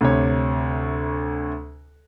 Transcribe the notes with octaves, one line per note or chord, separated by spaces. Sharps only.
D2 C3 C#5